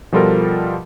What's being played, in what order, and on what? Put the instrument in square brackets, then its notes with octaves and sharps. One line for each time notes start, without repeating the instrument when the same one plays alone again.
[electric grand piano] B2 F3 G3 F4 A4 A#4